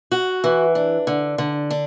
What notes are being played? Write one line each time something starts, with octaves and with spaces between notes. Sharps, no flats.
F#4
E3
D4
D3
D3
D4